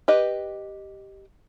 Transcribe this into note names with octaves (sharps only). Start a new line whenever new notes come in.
G4 B4 D#5